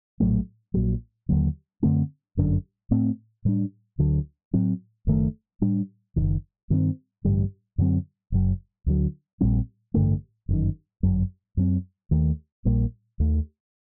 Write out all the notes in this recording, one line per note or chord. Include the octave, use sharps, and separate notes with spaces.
A#1 A2 F#3 A3
A#1 A#2 F#3
D#2 D3 F#3 A#3
F#2 D3 A3 C4
G1 F#2 D3
A2 A3 C4
A2 G3 D4
D2 D3 F#3
A2 F#3 C4
F#1 F#2 D#3 A3
A2 G3 D4
F#1 F#2 D#3
G2 D#3 A3 C4
A1 G2 D3 G3
F#2 D3 F#3 C4
F#1 F#2 F#3
D2 D3 F#3
A#1 A#2 G3 C4
A1 G2 D3 A3
G1 F#2 D#3
G1 F#2 F#3
F#2 F#3 C4
D#2 D#3 A3
A#1 A#2 G3 A#3
D#2 D#3 A3